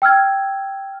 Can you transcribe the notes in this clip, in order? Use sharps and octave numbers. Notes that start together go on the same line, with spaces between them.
G5 E6 F6 G#6